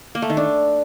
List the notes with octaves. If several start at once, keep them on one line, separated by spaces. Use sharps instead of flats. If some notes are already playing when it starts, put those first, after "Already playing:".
A#3
A3
D#3
D4